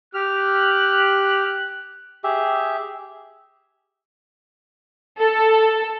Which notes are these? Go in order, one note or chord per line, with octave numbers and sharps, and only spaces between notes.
G4 F6 F#6
G4 G#4 E5
A4